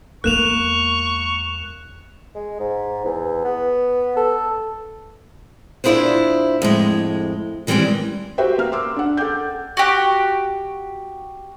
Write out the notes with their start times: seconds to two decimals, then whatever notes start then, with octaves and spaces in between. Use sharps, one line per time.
0.24 E2 G#3 A#3 C#6 F#6 E7 F7
2.35 G#3
2.60 G#2
3.05 E2
3.44 B3
4.17 A4
5.84 A#2 D4 E4 G#4 B4 C5
6.62 F2 A2 G#3
7.67 D#3 E3 G3 G#3 C4 C#4
8.38 F#4 G4 B4 C5 E5 G5
8.58 A#3 F6
8.72 C6 D6 E6
8.96 D4 F#5
9.17 A4 F#5 G5 D6 G6
9.77 F#4 G4